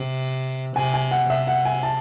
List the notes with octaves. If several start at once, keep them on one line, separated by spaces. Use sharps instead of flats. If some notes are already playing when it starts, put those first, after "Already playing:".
Already playing: C3
C3 G#5
G#5
F#5
C3 E5
F#5
G#5
A5